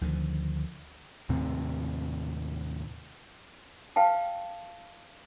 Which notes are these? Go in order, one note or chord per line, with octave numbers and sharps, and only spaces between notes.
D2 D3 D#3 F3
D#2 A2 C3 C4
B4 F5 G5 A5